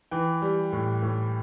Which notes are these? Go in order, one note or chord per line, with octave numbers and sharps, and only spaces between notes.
E3 G5
G3
A2
A2